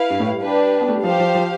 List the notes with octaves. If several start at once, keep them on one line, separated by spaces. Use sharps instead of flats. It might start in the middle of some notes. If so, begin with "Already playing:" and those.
Already playing: E4 B4 F5
G2
A2
G3
D4 G4 B4
B3
A3
G3
F3 G4 C5 F5
F3
F3